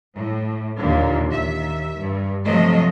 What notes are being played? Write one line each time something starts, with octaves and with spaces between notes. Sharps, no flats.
A2
D#2 A#2 D3
D#2 E5
G2
C3 F3 F#3 A3 D#5